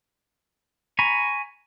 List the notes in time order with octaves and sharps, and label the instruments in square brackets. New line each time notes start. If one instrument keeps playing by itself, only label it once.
[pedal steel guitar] G#5 A#5 B5 C#6